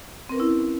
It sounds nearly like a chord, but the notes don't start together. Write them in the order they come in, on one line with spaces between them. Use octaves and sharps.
C4 A#4 B4 C#4 E4